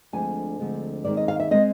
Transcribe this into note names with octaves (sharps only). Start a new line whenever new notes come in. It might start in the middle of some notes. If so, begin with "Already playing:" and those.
D2 D3 F3 G#3 C4 G#5
D2 D3 F3 G#3 C4
D#2 D#3 G#3 C4 D5
D#5
F5
E5
D#3 G#3 C4 D#5